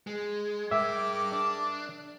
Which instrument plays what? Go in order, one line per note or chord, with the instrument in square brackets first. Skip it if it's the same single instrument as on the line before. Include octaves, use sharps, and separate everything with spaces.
[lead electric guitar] G#3
[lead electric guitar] G2 G5 [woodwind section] G#4 A#4 D6 [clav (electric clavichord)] E5
[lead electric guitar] D4